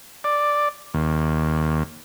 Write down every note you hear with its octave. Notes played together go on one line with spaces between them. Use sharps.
D5
D#2